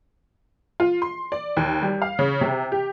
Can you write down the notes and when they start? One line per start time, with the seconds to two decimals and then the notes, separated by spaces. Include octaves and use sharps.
0.80 F4
1.02 C6
1.32 D5
1.57 D#2
1.82 G3
2.02 F5
2.19 C#3
2.41 C3
2.72 G4